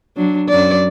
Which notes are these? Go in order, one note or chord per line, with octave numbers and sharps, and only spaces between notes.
F#3 D4
F#2 F#3 D5